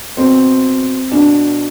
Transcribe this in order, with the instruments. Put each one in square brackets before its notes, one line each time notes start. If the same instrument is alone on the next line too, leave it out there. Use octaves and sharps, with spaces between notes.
[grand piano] B2 C4
B2 D4